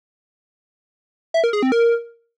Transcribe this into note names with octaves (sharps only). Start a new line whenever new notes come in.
E5
A#4
G#4
C4
A#4